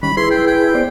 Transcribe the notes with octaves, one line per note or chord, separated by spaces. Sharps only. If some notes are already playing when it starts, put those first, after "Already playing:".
D#3 G3 C#4 B5
E4 G#4 B4 C6
G5
G5
B3 C5 D5